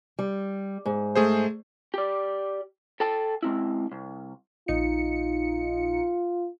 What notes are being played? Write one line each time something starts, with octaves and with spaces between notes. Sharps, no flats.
G3
G#2
A3 G#4 C5
G4 D5
A4 G5 A5
G#3 C4 E4
C2
A#1 D#4 F4 C#7